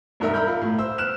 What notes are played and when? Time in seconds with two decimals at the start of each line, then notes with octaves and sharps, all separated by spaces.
0.20 E1 G2 D#4 A#4 E5
0.34 E5 A#5 B5 F6 G6
0.48 F4
0.62 A2
0.79 C5 E6
0.98 F6 F#6 E7